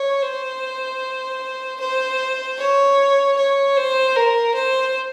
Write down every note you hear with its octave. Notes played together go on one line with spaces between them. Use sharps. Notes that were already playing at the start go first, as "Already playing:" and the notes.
Already playing: C#5
C5
C5
C#5
C#5
C5
A#4
C5